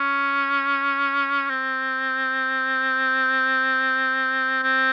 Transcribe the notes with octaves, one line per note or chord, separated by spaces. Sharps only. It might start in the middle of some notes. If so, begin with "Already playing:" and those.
Already playing: C#4
C4
C4